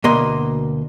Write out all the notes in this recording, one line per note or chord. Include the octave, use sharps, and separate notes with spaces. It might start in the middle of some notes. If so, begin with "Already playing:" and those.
D2 B2 A#3 D#5 C6